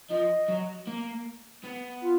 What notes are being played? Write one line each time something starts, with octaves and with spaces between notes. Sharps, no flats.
F3 D#5
F#3
A#3
B3
F4